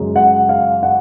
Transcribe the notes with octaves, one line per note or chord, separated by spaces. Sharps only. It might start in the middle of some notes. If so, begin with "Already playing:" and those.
Already playing: F#2 C#3 G#3
F#5
F5
F#5